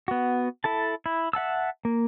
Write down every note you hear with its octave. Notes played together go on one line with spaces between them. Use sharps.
B3 F#4
E4 A4 A5
E4
E5 F#5 A5 E6
A#3